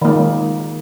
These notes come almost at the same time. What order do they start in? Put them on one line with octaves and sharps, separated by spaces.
D#3 A#3 G#3